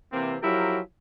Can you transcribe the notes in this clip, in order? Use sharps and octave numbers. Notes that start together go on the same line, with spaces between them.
C3 E3 A#3 C4
F3 F#3 E4 G4 A#4